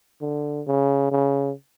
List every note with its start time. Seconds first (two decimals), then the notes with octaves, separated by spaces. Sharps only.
0.21 D3
0.67 C#3
1.11 C#3